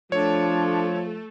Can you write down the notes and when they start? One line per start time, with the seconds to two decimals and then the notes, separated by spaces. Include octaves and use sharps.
0.12 F3 A3 D4 A4 C#5